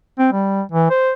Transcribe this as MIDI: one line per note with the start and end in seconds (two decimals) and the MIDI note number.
0.19 0.28 60
0.33 0.62 55
0.72 0.90 52
0.90 1.12 72